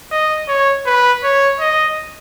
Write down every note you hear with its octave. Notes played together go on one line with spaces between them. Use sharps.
D#5
C#5
B4
C#5
D#5